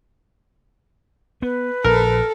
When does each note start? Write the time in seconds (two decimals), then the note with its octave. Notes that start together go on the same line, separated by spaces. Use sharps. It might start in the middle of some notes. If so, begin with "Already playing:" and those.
1.42 B3 B4
1.84 A#1 A4 A#4